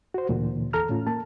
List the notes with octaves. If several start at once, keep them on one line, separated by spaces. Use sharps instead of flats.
F#4 C5
D2 A#2 D3 E3
E2 A4 A#5 F6
A2 C#4 F4
A#3 A5